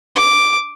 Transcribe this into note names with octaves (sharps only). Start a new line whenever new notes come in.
D6